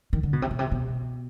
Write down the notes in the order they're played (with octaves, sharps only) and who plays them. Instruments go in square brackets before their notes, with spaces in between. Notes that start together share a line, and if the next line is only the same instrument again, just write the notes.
[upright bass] D#3
D3
B2
C3
B2
C3
B2